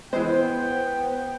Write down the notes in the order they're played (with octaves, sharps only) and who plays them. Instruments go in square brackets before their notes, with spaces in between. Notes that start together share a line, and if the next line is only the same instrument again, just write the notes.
[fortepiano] E3 G#3 [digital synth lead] B3 [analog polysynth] C5 [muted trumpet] G5